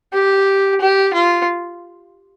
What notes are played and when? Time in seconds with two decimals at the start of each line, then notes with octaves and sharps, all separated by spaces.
0.14 G4
0.81 G4
1.14 F4